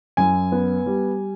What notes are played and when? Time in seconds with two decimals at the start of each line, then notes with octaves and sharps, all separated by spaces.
0.17 F#2 G#5
0.52 B3
0.86 G3